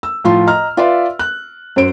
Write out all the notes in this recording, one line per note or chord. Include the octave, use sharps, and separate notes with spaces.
E6
A2 F3 F4 C6
D#5 A#5 F6
F4 B4 D5 E5 F5 C6
F#6
F#2 C5 D7